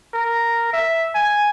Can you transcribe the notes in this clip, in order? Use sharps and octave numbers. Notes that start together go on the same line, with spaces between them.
A#4
E5
G#5